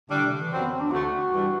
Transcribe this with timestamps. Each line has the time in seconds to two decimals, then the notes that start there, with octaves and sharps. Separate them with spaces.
0.09 A2 D3 G3 D4
0.20 C3
0.30 D3
0.41 E3
0.50 F#2 F#3 C4
0.61 B3
0.71 C4
0.81 D4
0.90 D2 D3 A3 F#4
1.31 G2 E3 G3 D4